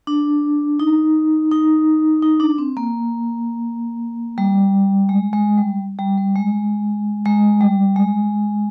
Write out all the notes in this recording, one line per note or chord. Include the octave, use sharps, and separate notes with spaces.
D4
D#4
D#4
D#4
D4
C4
A#3
G3
G#3
G#3
G3
G3
G3
G#3
G#3
G3
G#3